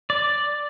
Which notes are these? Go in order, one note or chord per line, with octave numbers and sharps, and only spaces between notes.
D5